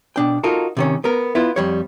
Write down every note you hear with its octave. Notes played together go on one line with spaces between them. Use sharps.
B2 D4 G5
D#4 F4 F#4 A4 A#4
C3 D#3 C#4
B3 A#4
B3 E4 F4
F2 G3 C#5